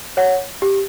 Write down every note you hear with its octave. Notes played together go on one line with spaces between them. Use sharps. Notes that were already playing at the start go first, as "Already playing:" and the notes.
C#5 F#5
G4